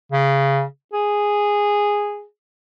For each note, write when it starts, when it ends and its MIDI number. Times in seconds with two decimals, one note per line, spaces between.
0.12 0.63 49
0.93 2.24 68